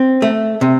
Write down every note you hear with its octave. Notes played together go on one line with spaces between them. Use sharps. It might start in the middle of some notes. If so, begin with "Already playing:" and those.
Already playing: C4
A3
C3